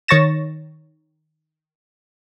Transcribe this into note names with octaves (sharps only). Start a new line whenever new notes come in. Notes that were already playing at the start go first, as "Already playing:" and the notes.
D#3 C#5 C#6 A6 A#6 E7